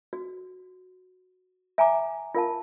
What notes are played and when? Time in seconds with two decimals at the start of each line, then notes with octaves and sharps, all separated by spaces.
0.13 F#4
1.78 E5 G#5 A#5 D6
2.35 F4 A#4 F5 A5